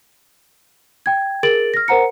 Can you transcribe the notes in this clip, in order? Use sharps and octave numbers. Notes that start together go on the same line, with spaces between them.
G5 G#6
G#4 A#4 A6 D7 F#7
F6 A#6
A#4 C5 F#5 A#5 C#7